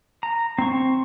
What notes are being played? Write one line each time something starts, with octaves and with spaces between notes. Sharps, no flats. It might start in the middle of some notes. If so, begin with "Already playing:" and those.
A#5
C4 C#6